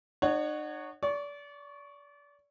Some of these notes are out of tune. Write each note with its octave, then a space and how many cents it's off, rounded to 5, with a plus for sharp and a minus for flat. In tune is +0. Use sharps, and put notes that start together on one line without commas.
D#4 -45 C#5 +0 F#5 +0
D5 -30 C#6 +0